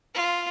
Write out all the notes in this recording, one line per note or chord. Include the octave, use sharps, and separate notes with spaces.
F4